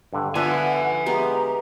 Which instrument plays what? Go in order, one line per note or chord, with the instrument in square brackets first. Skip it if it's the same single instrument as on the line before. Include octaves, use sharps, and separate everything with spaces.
[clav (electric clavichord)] G2 D3
[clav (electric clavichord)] D3 [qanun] B3 F4 C#5 [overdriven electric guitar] E5 G#5 [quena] F#5
[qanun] G#3 B3 G4 [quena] A#5